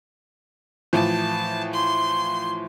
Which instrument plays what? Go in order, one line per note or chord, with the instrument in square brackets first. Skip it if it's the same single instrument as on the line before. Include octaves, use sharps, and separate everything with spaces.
[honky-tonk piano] A2 E3 F3 [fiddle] A5
[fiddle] C6